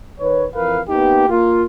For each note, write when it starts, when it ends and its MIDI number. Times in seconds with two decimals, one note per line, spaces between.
0.20 0.45 51
0.20 0.45 71
0.20 0.45 73
0.54 0.81 41
0.54 0.81 52
0.54 0.81 70
0.54 0.81 71
0.54 0.81 77
0.88 1.26 58
0.88 1.26 59
0.88 1.26 63
0.88 1.26 67
1.29 1.64 58
1.29 1.64 65